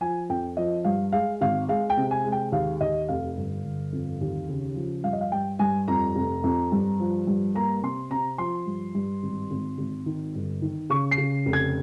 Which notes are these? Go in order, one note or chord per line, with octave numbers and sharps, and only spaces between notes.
F3 G#5
F2 G5
F3 D#5
G2 F5
G#3 F5
G#1 F5
G#3 F5
G5
C3
G#5
G#3
G5
D#2 F5
D#2 D#5
F1 F5
G1
G1
F2
D#2
C#3
F3
G2 F5
D#5
F5
G2 G5
G2 G#5
F2 A#5
F1
F2
G2
F3
G2
A#3 A#5
C3 C6
C3 A#5
F3 C6
G2
G2
G#1
G#1
G#1
D#3
G1
D#3
C#3 C#6
C7
C#3
F1
G#6